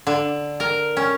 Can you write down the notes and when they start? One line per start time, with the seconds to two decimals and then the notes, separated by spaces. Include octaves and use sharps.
0.07 D3
0.60 A#4
0.97 C#4